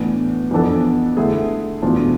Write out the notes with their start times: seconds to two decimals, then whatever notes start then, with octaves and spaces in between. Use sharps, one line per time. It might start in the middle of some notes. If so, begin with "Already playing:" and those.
Already playing: A2 E3 B3 D4
0.51 F2 E3 B3 D4 A4
1.17 D3 A3 E4 G#4
1.82 E2 B2 A3 D4 F4